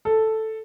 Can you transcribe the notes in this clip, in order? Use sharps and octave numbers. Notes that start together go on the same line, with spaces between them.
A4